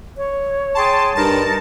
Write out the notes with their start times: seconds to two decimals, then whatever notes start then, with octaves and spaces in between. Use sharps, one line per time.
0.17 C#5
0.75 G#4 G5 A5 C6
1.15 G2 D#4 A#4 A5